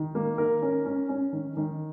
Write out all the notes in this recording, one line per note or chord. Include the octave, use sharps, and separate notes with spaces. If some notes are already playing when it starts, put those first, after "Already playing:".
Already playing: D#3
A#3
D#3 A#4
C#4
C#4
C#4
D#3
D#3